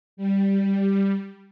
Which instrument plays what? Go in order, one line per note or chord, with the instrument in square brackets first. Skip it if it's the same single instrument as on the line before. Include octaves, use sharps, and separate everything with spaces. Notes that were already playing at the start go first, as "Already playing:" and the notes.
[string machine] G3